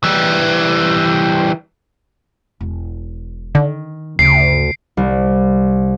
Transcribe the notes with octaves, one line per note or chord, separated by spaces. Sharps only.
E3 G3
E1
D3 D#3
D2 G2 C#3 C7 D7
C2